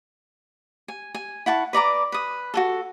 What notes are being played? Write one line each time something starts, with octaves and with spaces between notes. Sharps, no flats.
G#5
G#5
E4 F#5 A5 C#6
B4 D5 A#5 D6
B4 D#6
F#4 G#4 A4